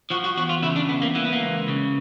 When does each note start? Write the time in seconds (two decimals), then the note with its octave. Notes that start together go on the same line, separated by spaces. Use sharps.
0.10 F3 F#4
0.24 F#4
0.37 E2 F#4
0.49 F4
0.62 C#3 E4
0.76 D4
0.89 E2 B3
1.02 A#3
1.15 E3 A#3
1.25 B3
1.33 A#3
1.41 C#2
1.68 C#3